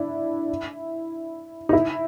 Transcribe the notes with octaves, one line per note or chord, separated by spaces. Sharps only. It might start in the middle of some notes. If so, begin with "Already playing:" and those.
Already playing: D4 E4
D#4
E4